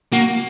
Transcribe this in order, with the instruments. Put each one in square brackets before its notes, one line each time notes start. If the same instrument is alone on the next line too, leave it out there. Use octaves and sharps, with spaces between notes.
[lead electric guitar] A#3 [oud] F#4